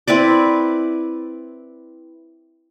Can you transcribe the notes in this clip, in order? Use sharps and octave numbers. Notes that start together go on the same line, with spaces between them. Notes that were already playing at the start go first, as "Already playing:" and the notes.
C4 E4 B4 D5